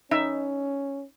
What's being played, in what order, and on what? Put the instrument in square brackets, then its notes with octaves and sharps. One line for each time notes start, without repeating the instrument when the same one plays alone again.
[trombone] C#4 [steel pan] D#4 E5